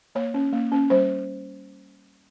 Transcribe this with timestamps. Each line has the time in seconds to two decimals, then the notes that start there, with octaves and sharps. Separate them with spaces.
0.15 A#3 C#5
0.34 C#4
0.53 A#3
0.72 C#4
0.90 G3 C5